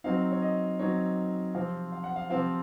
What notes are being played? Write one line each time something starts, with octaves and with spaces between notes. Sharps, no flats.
F#3 C4 D#4 F5
C#5
D#5
F#3 C4 D#4 C#5
C3 F3 C4 F4 F5
F5
F#5
F5
C3 F3 C4 F4 F5